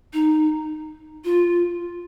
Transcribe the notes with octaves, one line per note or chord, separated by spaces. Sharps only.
D#4
F4